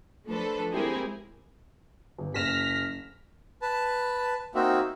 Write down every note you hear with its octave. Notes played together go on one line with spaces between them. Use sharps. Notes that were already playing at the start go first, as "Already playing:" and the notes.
F3 A3 D4 A4 B4 C5
G#3 C4 E4 G4 G#4 A#4
G1
F#1 F6 A#6 B6 E7
B4 A5
A#3 C4 D#4 F#4 E5